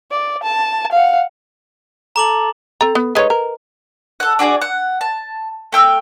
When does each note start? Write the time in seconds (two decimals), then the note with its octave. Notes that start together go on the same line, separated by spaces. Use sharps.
0.11 D5
0.43 A5
0.92 F5 F#5
2.16 A4 A#5 D6 F#7
2.81 C4 A4 A#5
2.95 B3
3.15 G#3 D#4 B4 C#5 D#5 G#6
3.30 A#4
4.20 A4 F#5
4.39 D4 F#4 G#4 D5
4.61 F#5
5.01 A5
5.73 A3 G5 E6 F6